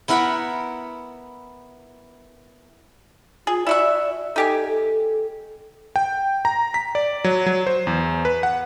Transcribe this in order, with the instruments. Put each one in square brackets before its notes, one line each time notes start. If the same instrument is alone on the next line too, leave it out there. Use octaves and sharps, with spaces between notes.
[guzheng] B3 E4 A#4 F#5 B5
[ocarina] F4 [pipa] G#4
[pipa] E4 F#4 E5 [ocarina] D5
[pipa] D#4 G4 G#5 [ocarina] A4
[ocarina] A4
[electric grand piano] G5
A#5
B6
D5
F#3
F#3
C5
E2
B4
F#5